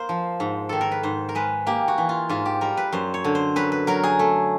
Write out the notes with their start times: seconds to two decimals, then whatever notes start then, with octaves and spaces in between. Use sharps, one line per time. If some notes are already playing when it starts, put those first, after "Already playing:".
Already playing: A#3 A#4 C5
0.09 F3
0.40 G#2
0.69 D#3 A4
0.81 A#4
0.92 B4
1.03 G#2 C5
1.29 A#4
1.35 G#3 B4
1.67 A#3 G4
1.88 F#4
1.98 E3
2.09 F4
2.29 G#2 F4
2.46 G4
2.61 G3 A#4
2.77 B4
2.93 F#2 C5
3.14 C#5
3.24 D3
3.35 C5
3.56 F#2 B4
3.72 B4
3.87 F#3 A#4
4.03 G#4
4.19 A3